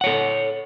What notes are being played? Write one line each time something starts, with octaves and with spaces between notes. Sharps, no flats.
A4 C#5 F#5